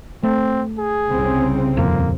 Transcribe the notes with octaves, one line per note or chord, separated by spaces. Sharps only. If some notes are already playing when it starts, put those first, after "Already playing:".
A3 C4
G#4
C2 C#3 C4
D#1 F2 A#3